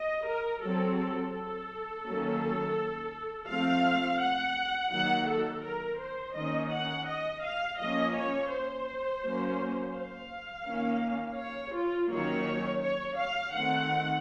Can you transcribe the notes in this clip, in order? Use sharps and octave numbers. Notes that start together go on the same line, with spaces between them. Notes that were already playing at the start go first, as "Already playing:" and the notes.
Already playing: D#5
A#4
F#3 C4 A4
A4
A4
D#3 F#3 A#3 C#4
F3 A3 C4 F5
F#5
D#3 F#3 A#3 F#5
A4
A#4
C5
D#3 A#3 C#4 D#5
F#5
D#5
F5
F3 A#3 C#4 D#5
C#5
C5
F#3 A#3 C#4
F5
D#3 A#3 C#4
C#5
F4
D#3 F#3 A#3 C#4 C#5
C#5
F5
D#3 A3 C4 F#5